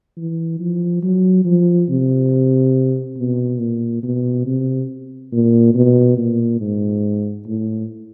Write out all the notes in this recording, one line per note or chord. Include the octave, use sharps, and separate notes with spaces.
E3
F3
F#3
F3
C3
B2
A#2
B2
C3
A#2
B2
A#2
G#2
A2